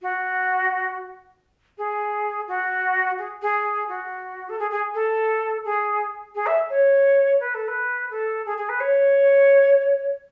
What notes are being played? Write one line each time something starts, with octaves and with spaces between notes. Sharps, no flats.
F#4
G#4
F#4
G#4
G#4
F#4
A4
G#4
G#4
A4
G#4
G#4
E5
C#5
B4
A4
B4
A4
G#4
G#4
B4
C#5